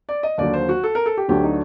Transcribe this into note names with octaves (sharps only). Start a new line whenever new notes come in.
D5
D#5
D#2 D3 F#3 D5
C5
F#4
A4
A#4
A4
G4
D2 D3 F#3 A3 D4 G4
D#4